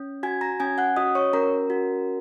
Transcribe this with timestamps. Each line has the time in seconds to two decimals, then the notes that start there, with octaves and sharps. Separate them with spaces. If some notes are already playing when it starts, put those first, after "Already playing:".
Already playing: C#4
0.23 F#4 G#5 G#6
0.41 A#5 A#6
0.60 C#4 G#5 G#6
0.78 F#5 F#6
0.97 F#4 D#5 D#6
1.15 C#5 C#6
1.33 C#4 A#4 A#5
1.70 F#4